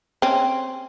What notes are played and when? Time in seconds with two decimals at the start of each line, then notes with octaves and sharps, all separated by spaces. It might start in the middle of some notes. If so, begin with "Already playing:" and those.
0.22 C4 C#4